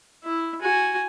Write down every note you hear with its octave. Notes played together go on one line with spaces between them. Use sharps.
E4 E5
F#4 G#5